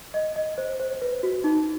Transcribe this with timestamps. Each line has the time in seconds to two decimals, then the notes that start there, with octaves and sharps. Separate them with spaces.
0.14 D#5
0.36 D#5
0.58 C5
0.80 C5
1.02 B4
1.23 F#4
1.44 D#4